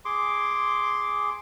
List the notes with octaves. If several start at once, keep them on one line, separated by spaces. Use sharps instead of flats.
G#4 C6 D6